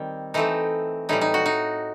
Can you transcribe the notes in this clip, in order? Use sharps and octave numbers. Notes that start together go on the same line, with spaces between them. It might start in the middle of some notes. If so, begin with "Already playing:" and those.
Already playing: D#3 G3 C4
E3 A3 C4 D#4
A2 E3 G3 D#4
D#4
F#4
D#4